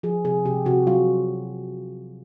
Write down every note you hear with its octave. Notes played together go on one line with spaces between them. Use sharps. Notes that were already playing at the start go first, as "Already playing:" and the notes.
F3 G#4
C3 G#4
C3 G4
C3 F#4
F#3 F4